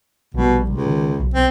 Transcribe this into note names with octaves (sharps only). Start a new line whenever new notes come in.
A#1 B2 G3
C#2 C3
D#3
B1
B1 C4